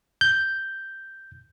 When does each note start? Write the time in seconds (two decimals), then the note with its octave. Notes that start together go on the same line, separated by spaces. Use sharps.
0.21 G6